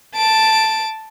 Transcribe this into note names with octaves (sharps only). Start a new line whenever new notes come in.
A5 D7